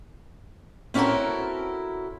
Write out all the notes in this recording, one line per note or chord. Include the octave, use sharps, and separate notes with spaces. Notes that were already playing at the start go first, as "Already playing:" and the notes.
C4 C#4 E4 F#4 A4 A#4